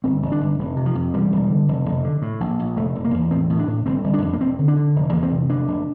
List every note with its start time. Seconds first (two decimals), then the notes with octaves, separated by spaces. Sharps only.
0.04 G1 C4
0.22 G1
0.32 D4
0.40 G1
0.59 F1
0.77 C3
0.86 F3
0.95 F2
1.14 E1 G3
1.32 E1
1.50 D3
1.68 F1
1.85 F1
2.04 D3
2.22 A2
2.40 A#1
2.59 A#1
2.77 F1 A3
2.95 F1
3.05 A#3
3.14 E2
3.31 A2 C4
3.50 A2
3.59 D4
3.68 A2
3.86 G1 C4
4.04 G1
4.14 D4
4.22 F2
4.33 A#3
4.41 E1 C4
4.59 D3
4.68 D4
4.77 D3
4.96 F1
5.13 E2 A#3
5.23 C4
5.31 C3
5.50 F1 D4
5.67 F1